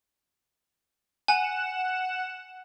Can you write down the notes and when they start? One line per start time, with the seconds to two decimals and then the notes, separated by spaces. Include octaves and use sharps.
1.28 F#5 G#5 E7